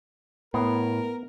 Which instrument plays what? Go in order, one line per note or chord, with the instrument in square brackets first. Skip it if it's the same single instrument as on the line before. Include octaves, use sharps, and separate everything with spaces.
[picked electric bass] A2 [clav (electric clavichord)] B3 [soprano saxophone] A#4